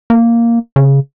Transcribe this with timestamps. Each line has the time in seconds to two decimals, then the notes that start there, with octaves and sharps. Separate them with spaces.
0.10 A#3
0.76 C#3